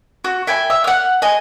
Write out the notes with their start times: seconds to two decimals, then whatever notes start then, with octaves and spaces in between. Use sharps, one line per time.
0.24 F#4
0.47 E5 G5 G#5 B5
0.70 E5
0.84 F#5 F6
1.22 D#5 G#5